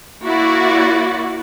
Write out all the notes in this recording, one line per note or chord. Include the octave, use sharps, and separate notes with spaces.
A#3 E4 F#4 D5 F#5